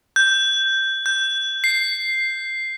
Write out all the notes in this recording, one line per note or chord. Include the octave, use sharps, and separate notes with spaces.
G6
G6
C7